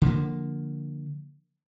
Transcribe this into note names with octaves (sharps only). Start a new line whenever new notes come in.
D3 F3 G3 A#3